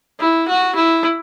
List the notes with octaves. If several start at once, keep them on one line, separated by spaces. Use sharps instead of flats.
E4
F#4
E4